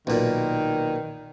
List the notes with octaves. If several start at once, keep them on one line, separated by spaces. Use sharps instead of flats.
B1 A#2 D#3